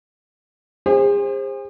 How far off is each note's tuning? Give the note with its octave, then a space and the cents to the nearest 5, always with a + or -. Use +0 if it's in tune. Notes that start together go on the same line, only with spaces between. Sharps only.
G#4 -40 C5 +20